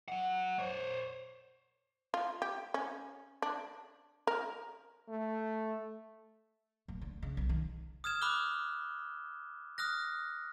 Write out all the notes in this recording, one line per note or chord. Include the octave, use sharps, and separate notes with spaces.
F#3 F#5
C5 C#5
F4
G4
C#4
D4
A#4
A3
D1
D3
C#3
B1
D#3
D#6 F6 G#6 E7
B5 D6 D#6 F6 F#6 G7
D#6 F6 F#6 A#6